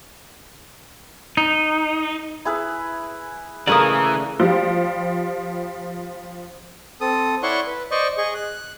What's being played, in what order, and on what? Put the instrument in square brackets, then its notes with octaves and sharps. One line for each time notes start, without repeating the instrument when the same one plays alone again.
[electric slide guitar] D#4
[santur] E4 G#4 B4
[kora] C#3 A3 A#4 [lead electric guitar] E3 [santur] A#3 F5 [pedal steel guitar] D5 D#6
[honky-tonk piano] F3 G3
[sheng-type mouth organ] C4 A4 D#6
E4 C#5 D5 F#5 C6 C#6
B4
C5 D5 D#5 C#6
G#4 D#5 C#6
F#6